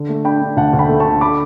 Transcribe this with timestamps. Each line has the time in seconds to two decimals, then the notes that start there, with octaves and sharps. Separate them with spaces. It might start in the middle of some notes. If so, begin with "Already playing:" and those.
Already playing: D3
0.09 A3
0.24 D4 G5 B5
0.42 D4
0.56 D2 F#5 A5
0.73 D2
0.79 G5 B5
0.89 A3
1.00 A5 C#6
1.05 D3
1.21 B5 D6